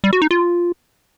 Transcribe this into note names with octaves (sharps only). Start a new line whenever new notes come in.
G3
F#4
D#4
F4